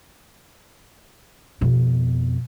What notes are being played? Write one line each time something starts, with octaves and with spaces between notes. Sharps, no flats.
F2 B2